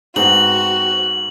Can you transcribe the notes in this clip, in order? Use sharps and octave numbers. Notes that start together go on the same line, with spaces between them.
G#2 B3 C4 F#4 G#4 F#7